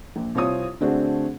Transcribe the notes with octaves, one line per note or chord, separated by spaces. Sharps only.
A#1
C2 C4 F4 C#5 D#6
D3 A3 C4 D4 F#4 G#4